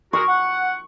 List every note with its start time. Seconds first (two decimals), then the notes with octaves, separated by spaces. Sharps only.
0.13 F#4 G#4 A#4 C#6
0.28 F#5